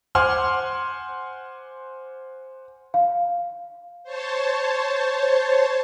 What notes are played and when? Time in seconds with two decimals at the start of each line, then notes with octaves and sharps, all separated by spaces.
0.15 C5 F#5 G#5 C6 D6 F6
2.94 F5
4.03 C5 C#5 A5